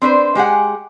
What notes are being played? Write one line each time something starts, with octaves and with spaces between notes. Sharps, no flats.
C4 D4 B4 C5
G#3 G4 G#4 F#5